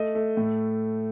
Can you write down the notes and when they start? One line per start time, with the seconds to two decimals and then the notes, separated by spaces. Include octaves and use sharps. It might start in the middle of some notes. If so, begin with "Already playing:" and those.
Already playing: A3 D#5
0.15 A3
0.37 A2